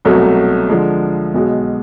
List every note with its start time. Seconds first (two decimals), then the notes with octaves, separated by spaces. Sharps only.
0.05 C2 B2 F#3 A3
0.69 D3 F3 G#3
1.34 B1 B2 G#3